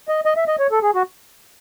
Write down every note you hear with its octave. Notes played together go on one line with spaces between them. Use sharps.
D#5
D#5
E5
D#5
C#5
A4
G#4
F#4